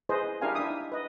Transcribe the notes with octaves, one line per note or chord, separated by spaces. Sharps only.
E4 G#4 B4 C5 D#5
D4 E4 G4 A#4 F5 G#5
D4 E4 E5 D#6
D#4
B4 D#5